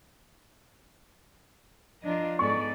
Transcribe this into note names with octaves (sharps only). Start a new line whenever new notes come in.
F3 D4 F4 D#5 A#5
G#2 B3 D#4 G#4 A4 D5 C#6